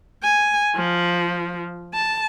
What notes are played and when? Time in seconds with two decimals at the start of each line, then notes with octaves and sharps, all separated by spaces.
0.23 G#5
0.76 F3
1.94 A5